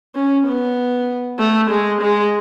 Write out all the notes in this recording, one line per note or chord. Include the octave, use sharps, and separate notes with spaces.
C#4
B3
A3
G#3
G#3